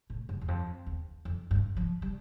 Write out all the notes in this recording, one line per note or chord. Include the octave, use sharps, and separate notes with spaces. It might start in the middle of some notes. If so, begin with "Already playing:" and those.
A2
G2
E2
F2
E2
F2
G2
F3
G3